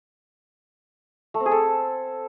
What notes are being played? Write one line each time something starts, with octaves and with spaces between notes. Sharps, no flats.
A3
C4
G#4
A4